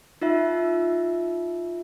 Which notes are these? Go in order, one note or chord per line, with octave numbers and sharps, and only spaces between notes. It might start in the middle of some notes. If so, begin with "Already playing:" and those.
D#4 F4 E5